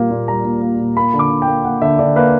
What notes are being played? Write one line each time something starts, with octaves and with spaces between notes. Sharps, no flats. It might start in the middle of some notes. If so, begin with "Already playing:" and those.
Already playing: A#2 G3 A#3
A#2
G3 A#5
A#2
A#3
A#2
A#3 B5
D3
D6
D3
G5
A#3
A#3 F#5
D3 E5
D3 D5
A#3 B4